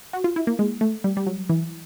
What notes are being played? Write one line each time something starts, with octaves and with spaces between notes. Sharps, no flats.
F#4
F4
E4
A#3
G#3
A3
G3
G3
F#3
E3